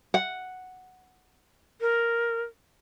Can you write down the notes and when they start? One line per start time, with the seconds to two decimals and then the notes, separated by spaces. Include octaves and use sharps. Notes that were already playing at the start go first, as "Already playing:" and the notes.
0.14 F#5
1.81 A#4